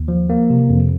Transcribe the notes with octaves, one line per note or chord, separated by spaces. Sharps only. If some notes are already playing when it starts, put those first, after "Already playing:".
Already playing: D#2
F3
A#3
C3
F2